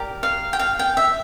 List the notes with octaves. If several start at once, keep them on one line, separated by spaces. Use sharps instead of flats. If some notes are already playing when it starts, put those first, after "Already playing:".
Already playing: G4 A#4 D5
F5
G5
F5
G5
E5